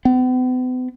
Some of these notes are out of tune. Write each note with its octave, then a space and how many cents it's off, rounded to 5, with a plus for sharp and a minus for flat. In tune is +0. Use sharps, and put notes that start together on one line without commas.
B3 +45